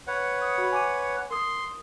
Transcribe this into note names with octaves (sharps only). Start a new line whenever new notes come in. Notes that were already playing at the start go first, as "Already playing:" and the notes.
B4 C#5 F#5
D#6
F#4 B5
G#5 D6 D#7
A#4 C6 D#6